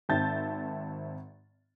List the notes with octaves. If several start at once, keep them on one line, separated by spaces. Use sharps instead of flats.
G#1 C4 E5 A5 G6 A6